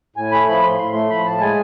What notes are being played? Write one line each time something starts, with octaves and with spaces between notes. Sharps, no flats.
A2 G#5
A3 B5
F3 B5
A2 C6
A2 C6
A3 C6
F3 B5
A2 A5
G#3 G#5